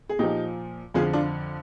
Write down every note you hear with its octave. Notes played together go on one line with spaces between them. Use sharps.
G#4
A#2 F3 D#4 G4
F2 D3 F3 F4 G#4
D4 F4